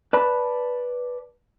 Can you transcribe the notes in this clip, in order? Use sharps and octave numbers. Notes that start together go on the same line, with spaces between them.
B4 D5 A5 B5